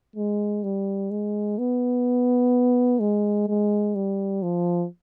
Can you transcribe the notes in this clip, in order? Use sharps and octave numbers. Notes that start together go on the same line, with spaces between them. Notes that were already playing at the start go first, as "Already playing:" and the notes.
G#3
G3
G#3
B3
G#3
G#3
G3
F3